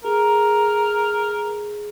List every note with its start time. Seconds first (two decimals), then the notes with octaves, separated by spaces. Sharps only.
0.05 G#4 A#4